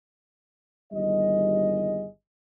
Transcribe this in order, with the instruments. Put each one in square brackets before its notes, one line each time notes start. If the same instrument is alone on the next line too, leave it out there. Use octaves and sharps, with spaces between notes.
[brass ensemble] G1 D#2 G3 G#4 D#5